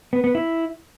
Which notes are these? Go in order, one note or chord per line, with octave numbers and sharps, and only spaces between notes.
B3
B3
E4